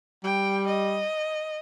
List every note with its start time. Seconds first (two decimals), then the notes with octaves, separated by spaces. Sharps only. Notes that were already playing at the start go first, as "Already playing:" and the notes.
0.24 G3 G5
0.67 D#5